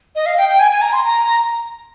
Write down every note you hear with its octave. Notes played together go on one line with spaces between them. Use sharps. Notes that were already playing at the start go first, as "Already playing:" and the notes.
D#5
F5
G5
G5
G#5
G#5
A#5
C6
A#5